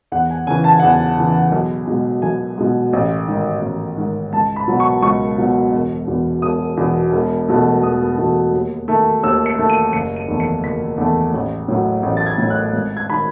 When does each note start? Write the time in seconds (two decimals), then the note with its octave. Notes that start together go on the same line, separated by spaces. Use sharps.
0.12 E2 F#5
0.30 G#5
0.47 C#3 E3 G#5
0.64 A5
0.73 G#5
0.80 E2 F#5
0.87 G#5
1.18 C#3 E3
1.52 B1
1.87 B2 G#3
2.22 B1 G#5
2.58 B2 G#3
2.93 A1
3.27 G#2 D#3
3.62 A1
3.97 G#2 D#3
4.33 C#2 A5
4.56 B5
4.68 B2 F#3
4.80 C#6
5.03 C#2 C#6
5.38 B2 F#3
5.73 E1
6.08 E2 B2
6.42 E1 D#6
6.77 E2 B2
7.12 E1
7.48 E2 B2 A3
7.83 E1 D#6
8.18 E2 B2 A3
8.52 D#2
8.88 D#3 A3
9.23 D#2 E6
9.46 C#7
9.59 D#3 A3
9.70 D#7
9.93 F#1 C#7
10.16 D#7
10.28 E2 D#3 A3
10.40 C#7
10.63 F#1 B6
10.98 E2 D#3 A3
11.34 A1
11.68 A2 F#3
12.03 A1
12.17 A6
12.26 G#6
12.38 A2 F#3
12.50 F#6
12.73 G#1
12.97 G#6
13.10 D#3 B5